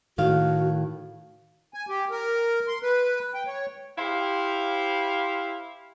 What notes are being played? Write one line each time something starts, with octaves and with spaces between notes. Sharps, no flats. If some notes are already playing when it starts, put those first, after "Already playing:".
A2 D#3 F#4 F5
G#5
G4
A#4
C6
B4
G5
C#5
E4 G4 C5 F5